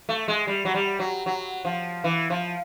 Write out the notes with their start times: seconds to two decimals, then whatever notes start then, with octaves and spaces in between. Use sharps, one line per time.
0.09 A3
0.28 G#3
0.47 G3
0.65 F#3
0.74 G3
0.99 F#3
1.26 F#3
1.65 F3
2.04 E3
2.30 F3